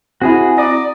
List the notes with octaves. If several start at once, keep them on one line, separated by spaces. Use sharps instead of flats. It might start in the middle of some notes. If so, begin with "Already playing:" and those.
C4 E4 F#4 G#4
D5 A#5 D#6